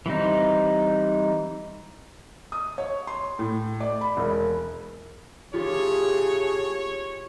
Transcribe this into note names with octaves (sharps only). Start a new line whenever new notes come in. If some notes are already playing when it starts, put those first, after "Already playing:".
E3 G3 C4 D#4
D#6
C#5
C6
A2
D5
B5
E1
A2 C#3 F4 G4 G#4 C#5